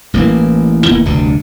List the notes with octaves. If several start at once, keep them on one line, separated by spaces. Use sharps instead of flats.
A1 E3 A3 A#3
D1 E3 A#3 B3
F1 D2 G2 D3